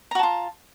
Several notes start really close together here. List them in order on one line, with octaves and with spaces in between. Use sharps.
A#5 F#4 A5 F4